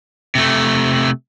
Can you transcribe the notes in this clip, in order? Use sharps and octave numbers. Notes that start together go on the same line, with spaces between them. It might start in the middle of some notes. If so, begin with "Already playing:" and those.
C3 A3